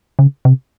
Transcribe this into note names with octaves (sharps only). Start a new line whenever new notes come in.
C#3
C3